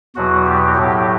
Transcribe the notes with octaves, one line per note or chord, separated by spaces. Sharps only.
E2 B2 F#3 F#4
G4
A2 F#3 G4